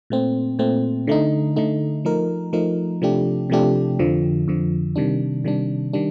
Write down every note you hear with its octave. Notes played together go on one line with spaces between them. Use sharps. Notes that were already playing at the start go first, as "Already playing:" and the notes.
A#2 A3 C4
A#2 A3 C4
D3 A3 D#4
D3 A3 D#4
F3 A3 D#4 A#4
F3 A3 D#4 A#4
C3 F3 A3 D4 G4
C3 F3 A3 D4 G4
F2 D3 F3
F2 D3 F3
C3 D#3 G3 D4
C3 D#3 G3 D4
D#3 G3 D4